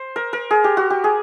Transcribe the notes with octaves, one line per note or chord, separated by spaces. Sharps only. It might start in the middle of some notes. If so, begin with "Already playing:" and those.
Already playing: C5
A#4
A#4
G#4
G4
F#4
G4
G#4